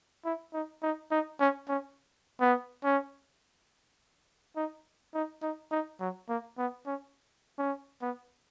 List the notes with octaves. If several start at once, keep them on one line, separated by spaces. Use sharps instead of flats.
E4
D#4
D#4
D#4
C#4
C#4
B3
C#4
D#4
D#4
D#4
D#4
F#3
A#3
B3
C#4
C#4
B3